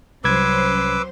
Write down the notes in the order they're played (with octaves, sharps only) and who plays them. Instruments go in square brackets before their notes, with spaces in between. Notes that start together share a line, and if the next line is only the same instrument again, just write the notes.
[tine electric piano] C2 G#6 [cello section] F#3 C#4 C5 [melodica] B4 D6 E6